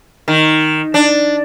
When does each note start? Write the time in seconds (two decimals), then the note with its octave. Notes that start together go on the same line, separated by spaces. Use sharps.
0.28 D#3
0.94 D4